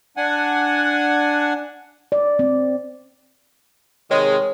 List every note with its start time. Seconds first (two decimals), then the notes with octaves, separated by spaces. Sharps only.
0.17 D4 F#5 G#5
2.12 D5
2.39 C4
4.11 C3 D#3 G#3 C#5